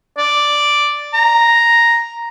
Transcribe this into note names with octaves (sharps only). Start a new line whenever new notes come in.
D5
A#5